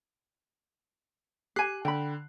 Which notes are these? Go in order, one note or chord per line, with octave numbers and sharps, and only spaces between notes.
G4 G#5 F#6 C7
D3 G5 B5